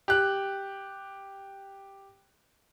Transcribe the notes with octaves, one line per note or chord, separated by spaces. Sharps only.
G4 F#6